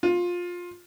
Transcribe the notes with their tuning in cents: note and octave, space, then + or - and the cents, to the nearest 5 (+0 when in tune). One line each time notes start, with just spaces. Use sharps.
F4 +15